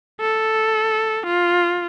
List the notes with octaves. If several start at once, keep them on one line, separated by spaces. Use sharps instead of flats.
A4
F4